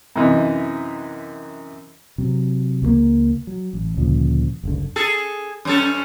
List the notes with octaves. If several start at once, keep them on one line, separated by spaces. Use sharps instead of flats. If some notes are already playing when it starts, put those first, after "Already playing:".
F#2 C3 E3 D#4
C3 F#3
C#2 F#3 A#3
F#3
A1
D2 A#2 C#3 F3
F#1 C#2 D3
G#4 A4
F#2 C#4 A4